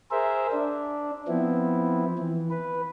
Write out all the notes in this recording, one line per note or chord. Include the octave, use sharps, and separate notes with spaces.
G#4 A#4 C5 E5
D4
F3 B3 C4 E4
E3
B4